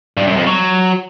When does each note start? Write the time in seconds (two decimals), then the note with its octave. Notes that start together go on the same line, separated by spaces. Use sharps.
0.17 G2
0.27 F#2
0.37 F2
0.47 F#3